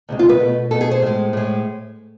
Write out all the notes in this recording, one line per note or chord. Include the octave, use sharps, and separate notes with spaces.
D2 C3 G#3
F4
B4
B2 A3
B2 A3 A4
G#4
C5
A2 G#3
A2 G#3